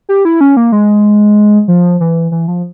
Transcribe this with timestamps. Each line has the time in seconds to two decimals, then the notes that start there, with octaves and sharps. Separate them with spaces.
0.09 G4
0.25 E4
0.41 C#4
0.57 A#3
0.72 G#3
1.68 F3
2.00 E3
2.32 E3
2.48 F3